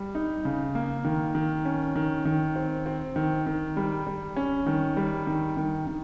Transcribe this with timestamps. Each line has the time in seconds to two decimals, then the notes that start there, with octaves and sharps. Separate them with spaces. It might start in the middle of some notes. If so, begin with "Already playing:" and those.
Already playing: G3
0.15 D#4
0.45 C#3
0.75 A#3
1.05 D#3
1.35 D#3
1.65 C#4
1.96 D#3
2.25 D#3
2.56 C4
2.86 C4
3.16 D#3
3.47 D#3
3.77 G3
4.07 G3
4.36 C#4
4.67 D#3
4.97 G3
5.27 D#3
5.57 D#3
5.87 D#3